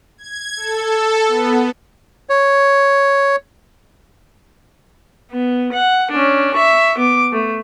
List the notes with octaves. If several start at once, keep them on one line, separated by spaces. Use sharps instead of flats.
G#6
A4
B3
C#5
B3
F#5
C#4 D4
E5 C#6
B3 D6
A3